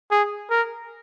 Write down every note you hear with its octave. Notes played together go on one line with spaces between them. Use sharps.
G#4
A#4